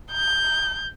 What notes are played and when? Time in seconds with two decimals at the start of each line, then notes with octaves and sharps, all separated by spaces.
0.13 G6